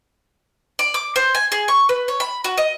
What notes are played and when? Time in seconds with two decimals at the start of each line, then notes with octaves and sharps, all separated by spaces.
0.79 D5
0.94 D6
1.16 C5
1.35 G#5
1.52 G#4
1.68 C#6
1.89 B4
2.08 C#5
2.20 B5
2.44 F#4
2.58 D#5